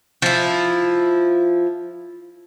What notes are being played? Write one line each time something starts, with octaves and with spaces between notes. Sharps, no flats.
F3 E4